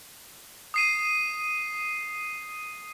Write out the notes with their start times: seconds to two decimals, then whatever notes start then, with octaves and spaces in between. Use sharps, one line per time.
0.74 D#6 C7 D#7